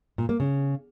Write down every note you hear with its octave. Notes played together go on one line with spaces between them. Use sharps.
A#2
A#3
C#3